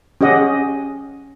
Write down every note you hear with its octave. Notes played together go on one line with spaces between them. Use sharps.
C#4 G4 G#4 D#5 F#5 D6